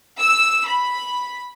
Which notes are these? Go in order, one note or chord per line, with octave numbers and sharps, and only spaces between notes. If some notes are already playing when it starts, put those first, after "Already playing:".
E6
B5